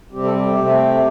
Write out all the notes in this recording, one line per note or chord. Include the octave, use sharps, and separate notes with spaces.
C3 G3 C4 G4
A4
G4
C3 A3 C4